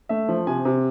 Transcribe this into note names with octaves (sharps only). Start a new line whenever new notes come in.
A3 E5
F3
C3 G#5
C3